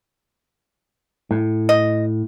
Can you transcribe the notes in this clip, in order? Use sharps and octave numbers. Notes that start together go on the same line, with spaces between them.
A2
D#5